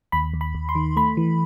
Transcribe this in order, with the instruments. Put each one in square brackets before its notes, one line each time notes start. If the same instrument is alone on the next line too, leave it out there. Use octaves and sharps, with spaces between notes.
[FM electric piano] D#2 B5
D#2
B5
D#2
C6
D#3
A3 B5
E3